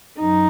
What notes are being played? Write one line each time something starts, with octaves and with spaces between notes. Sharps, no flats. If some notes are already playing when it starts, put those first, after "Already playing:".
F#2 D#4